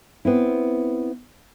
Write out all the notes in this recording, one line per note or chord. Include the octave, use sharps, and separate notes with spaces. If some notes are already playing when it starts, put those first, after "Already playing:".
B3 C4 E4